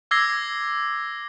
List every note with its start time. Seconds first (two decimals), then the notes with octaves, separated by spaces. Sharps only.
0.11 D6 E6 G#6 A#6 C7 G7